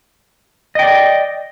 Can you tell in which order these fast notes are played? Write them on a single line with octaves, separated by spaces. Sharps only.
D#5 G5 D5